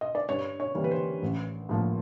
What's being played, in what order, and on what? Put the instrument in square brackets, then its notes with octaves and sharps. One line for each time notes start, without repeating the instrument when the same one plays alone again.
[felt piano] D#5
D5
G2 C#5
C#5
E3 G3 A#3
B4
C5
A1
A2 F3 A#3